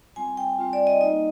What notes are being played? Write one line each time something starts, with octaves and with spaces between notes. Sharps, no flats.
G3 C4 F4 G#5
G5
G3 C4 F4
D5
D#5
G3 A#3 D#4 D#5